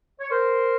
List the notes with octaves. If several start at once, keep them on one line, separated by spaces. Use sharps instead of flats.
C#5
A#4 C5